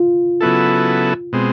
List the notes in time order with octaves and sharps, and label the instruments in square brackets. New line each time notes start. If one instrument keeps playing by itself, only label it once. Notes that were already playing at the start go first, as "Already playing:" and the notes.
Already playing: [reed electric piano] F4
[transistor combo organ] C#3 F#3 B3 E4 A4
B2 G#3 C4